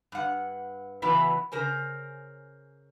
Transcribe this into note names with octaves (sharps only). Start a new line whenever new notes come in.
G2 F#5
C#3 E3 F#3 B3 E4 B4
C#3 A#4 C5 G#5